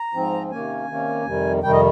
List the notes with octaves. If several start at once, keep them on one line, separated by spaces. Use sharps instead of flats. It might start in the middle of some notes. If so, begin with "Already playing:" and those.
Already playing: A#5
G#2 F3 C4
C3 D#3 A#3 C#4 G#5
C3 D#3 A#3 C#4
F2 C3 D#3 G3
F2 C3 D#3 G3 G5
D#5